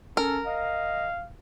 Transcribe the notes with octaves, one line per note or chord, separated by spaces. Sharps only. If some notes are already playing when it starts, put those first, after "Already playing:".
C#4 A4 A#4
D#5 F5